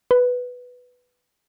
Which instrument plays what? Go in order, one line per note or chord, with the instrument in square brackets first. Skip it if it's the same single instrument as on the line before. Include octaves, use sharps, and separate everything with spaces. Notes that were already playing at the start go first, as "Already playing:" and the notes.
[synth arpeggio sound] B4